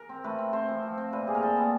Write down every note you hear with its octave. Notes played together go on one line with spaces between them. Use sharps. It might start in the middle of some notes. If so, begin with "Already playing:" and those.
Already playing: A#4
C4
A3 B4
C4
C4 C5
F3
F3
C4
A#2 B4
G3 G#4
A#4
A#2 A4
B3